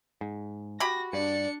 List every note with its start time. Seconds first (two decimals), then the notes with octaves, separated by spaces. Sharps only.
0.21 G#2
0.80 F#4 G4 B5 A#6
1.13 G2 D4 D5 C#7